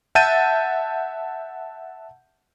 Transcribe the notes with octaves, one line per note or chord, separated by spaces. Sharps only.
E5 F#5 A5 G6 A6 D#7